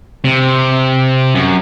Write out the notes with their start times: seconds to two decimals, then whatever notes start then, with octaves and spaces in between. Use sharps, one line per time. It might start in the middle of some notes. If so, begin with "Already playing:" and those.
0.24 C3
1.35 F#2